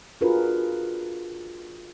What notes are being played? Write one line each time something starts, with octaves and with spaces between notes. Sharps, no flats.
D4 F4 F#4 G#4 A#4 B4